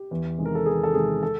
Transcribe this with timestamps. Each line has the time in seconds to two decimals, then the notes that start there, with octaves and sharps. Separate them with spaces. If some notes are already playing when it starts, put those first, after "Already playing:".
Already playing: G4
0.11 E2
0.38 C3 D#3 G#3
0.45 A#4
0.55 A4
0.66 E2 G#4
0.83 A4
0.94 C3 D#3 G#3 G#4
1.23 A4